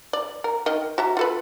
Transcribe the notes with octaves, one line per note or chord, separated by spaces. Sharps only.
D5
A#4
D#3 A#4 D#5
F#4 E5 A#5
F4 A4 B4